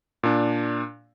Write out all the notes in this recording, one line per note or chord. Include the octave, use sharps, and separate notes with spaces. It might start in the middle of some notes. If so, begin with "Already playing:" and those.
A#2 D4